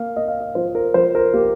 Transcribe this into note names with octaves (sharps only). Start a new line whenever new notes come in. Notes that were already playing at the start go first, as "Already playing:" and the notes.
Already playing: A#3 F5
A#3 D#5
F5
D#5
F3 C5
A#4
F3 C5
A#4
A#3 G4